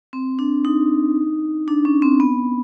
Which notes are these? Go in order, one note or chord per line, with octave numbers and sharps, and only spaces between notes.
C4
D4
D#4
D4
C#4
C4
B3